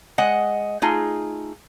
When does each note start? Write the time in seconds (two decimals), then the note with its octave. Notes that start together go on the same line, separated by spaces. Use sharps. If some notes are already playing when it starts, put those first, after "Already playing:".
0.18 G#3 D#5 F#5
0.82 A3 D#4 F4 G#4